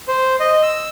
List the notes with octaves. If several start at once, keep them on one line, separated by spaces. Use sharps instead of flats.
C5
D#5
E6